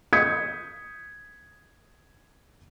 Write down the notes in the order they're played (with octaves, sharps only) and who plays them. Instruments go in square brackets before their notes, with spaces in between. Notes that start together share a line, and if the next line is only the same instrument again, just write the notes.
[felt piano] D#6 G6 G#6 B6 C#7